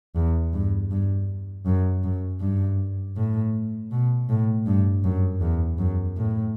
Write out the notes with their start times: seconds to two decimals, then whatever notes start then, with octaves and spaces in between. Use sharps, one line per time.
0.16 E2
0.54 G2
0.91 G2
1.66 F#2
2.04 F#2
2.41 G2
3.17 A2
3.91 B2
4.29 A2
4.67 G2
5.04 F#2
5.41 E2
5.79 F#2
6.17 A2